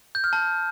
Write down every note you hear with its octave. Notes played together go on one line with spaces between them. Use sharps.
G6
F6
A5